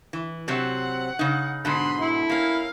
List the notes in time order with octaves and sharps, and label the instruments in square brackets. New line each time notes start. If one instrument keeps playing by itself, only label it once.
[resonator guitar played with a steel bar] E3
[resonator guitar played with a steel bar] C3 F#3 C4 [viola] F#5
[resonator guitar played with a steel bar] C#3 D#4
[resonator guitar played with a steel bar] G#2 B2 D3 [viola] B5 C6
[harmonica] E4
[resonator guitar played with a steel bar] A#3 C#4 [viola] F5